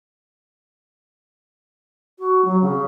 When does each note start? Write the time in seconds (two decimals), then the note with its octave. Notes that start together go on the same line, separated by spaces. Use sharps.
2.19 F#4
2.45 F#3
2.62 C#3